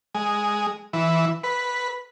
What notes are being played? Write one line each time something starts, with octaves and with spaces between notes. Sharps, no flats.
G#3
E3
B4